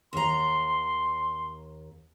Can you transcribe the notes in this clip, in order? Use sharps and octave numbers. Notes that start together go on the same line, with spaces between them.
D#2 A#5 C6